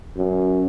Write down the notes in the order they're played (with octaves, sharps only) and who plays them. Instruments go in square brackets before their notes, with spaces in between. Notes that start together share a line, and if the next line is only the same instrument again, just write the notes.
[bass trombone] F#2